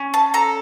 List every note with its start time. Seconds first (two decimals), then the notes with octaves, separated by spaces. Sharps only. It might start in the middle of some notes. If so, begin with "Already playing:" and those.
Already playing: C#4
0.14 A5
0.34 A4 A#5